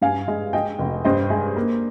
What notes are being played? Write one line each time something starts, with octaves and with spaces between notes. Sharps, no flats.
G2 F5 G#5
G#3
G#3 D#5 G5
F1
G2 C5 D#5
G#3
A#3